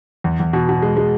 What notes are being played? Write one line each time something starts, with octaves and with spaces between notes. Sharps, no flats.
E2
E2
B2
B2
G#3
G#3